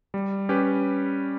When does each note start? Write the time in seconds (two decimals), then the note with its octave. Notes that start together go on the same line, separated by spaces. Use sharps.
0.14 G3
0.49 C#4 G4 B4